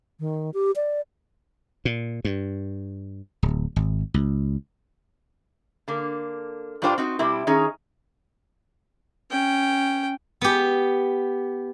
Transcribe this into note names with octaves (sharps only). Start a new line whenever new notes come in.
D#3
G4
D5
A#2
G2
D1
G#1
C#2
D3 A#3
G2 G3 D4 F4 C5 G5
C4 D#4 F#4
B2 G3 C4 E4 G4
D#3 C#4 D#4 G#4 C#5
C#4 G5
B3 G4